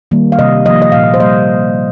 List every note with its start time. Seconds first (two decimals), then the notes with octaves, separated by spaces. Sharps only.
0.11 D#3 G3 A#3
0.32 F5
0.39 C3 D#5
0.65 F3 A#3 D#5
0.82 D#5
0.92 A#2 F5
1.14 C5
1.20 G3 A#3 D#5